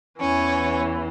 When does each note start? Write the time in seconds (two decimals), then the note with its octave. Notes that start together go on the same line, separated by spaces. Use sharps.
0.19 E2 E3 C#4 C#5